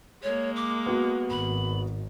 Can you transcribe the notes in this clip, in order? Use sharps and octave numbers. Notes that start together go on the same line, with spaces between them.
G#3 A#3 C#5
D6
B3 F#4
G#1 B5